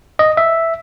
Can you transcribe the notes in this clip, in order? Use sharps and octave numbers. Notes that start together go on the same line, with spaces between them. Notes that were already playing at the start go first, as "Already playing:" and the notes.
D#5
E5